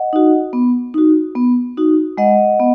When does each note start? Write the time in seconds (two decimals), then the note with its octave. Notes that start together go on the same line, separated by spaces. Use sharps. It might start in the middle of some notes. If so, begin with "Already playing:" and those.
Already playing: D#5 F#5
0.13 D#4 F#4
0.53 B3
0.94 D#4 F#4
1.35 B3
1.77 D#4 F#4
2.17 G#3 D#5 F#5
2.60 B3